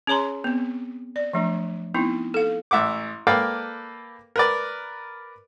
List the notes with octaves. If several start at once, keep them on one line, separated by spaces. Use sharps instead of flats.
C#4 G#4 C#5 A#5 C6
B3 C4
D5
F3 F#3 A3 D4
B3 C4 D#4 E4
A4 F5
A1 E5 F#5 D6
A#3 A4 B4 D5 F5 G5
A#4 B4 D5